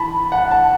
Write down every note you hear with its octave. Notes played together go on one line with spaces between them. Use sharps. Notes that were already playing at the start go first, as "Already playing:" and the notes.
Already playing: E3 A5 B5
F#5
A5